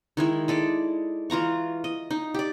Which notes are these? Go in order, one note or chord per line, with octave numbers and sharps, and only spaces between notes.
D#3 G#3 E4
G#3 A4 D5
E3 F4 A#5 C#6
D#5
D#4
G4 D5